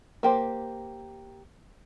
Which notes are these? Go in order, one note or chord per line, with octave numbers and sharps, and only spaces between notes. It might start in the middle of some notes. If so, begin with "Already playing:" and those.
A#3 G4 C5